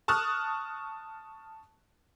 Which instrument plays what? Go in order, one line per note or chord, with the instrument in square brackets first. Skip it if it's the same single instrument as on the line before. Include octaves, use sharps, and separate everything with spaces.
[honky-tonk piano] A5 C#6 D#6 F6 F#6